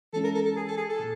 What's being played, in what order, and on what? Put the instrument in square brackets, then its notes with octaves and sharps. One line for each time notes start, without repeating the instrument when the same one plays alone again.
[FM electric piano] E3 G#3 C#4 E4 [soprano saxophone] A4
[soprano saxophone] A#4
A4
A4
G#4
A4
G#4
A4
[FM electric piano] A#2